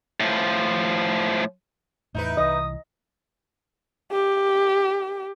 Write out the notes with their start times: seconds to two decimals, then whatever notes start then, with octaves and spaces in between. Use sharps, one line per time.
0.20 A2 F3
2.15 E2 A2 D#4 E4 B4
2.37 C2 E3 D#5 D#6
4.12 G4